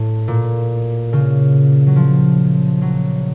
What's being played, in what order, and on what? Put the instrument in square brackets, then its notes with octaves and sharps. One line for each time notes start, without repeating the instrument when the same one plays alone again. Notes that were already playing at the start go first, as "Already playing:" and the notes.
Already playing: [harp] A2
A#2
C#3
F#3
F3
F#3